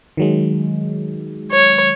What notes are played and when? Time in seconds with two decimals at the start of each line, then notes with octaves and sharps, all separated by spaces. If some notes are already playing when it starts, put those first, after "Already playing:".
0.17 D#3 F#3 G#3
1.52 C#5